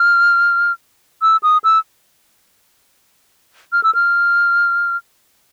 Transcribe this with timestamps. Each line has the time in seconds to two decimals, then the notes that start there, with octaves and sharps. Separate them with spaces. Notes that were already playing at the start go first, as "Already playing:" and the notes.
Already playing: F6
1.22 E6
1.43 D#6
1.64 E6
3.73 F6
3.83 E6
3.95 F6